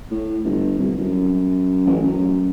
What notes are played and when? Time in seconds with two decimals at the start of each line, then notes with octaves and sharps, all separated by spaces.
0.11 A2
0.44 G1
0.79 C2
0.98 F#2
1.87 A1
2.04 F#2